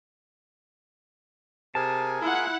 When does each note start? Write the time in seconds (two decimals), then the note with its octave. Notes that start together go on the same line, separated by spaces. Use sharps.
1.75 C3 G#4 A#4 G#5 A5
2.22 E4 F4 F#5